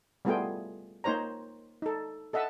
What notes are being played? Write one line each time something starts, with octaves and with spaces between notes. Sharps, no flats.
G3 A3 B3 F4 G#4 G5
A#3 D#4 C5 C#5 A#5
D#4 A4
A4 D#5 E5 F#5 A5